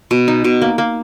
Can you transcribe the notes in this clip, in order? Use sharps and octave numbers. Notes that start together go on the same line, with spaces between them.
B2
D#4
B2
A#3
A#3